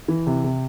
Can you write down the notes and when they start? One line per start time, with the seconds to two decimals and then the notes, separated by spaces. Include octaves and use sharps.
0.08 E3
0.26 C3
0.44 C3